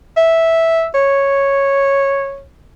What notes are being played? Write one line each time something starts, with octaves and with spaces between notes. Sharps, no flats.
E5
C#5